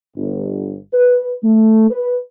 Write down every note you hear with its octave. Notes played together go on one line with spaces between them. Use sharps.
G1
B4
A3
B4